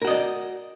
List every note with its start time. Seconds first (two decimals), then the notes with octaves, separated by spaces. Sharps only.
0.02 A#4
0.04 F#4
0.07 D#5
0.10 D5